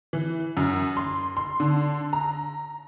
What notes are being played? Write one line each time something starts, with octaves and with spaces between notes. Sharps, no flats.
E3
F#2
C6
C6
D3
A#5